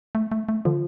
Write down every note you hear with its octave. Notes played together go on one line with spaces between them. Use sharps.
A3
A3
A3
D3 F3